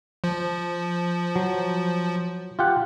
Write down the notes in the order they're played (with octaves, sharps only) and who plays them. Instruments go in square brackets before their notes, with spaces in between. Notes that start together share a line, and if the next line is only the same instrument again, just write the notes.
[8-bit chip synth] F3
[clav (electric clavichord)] F#3
F4 G4 F#5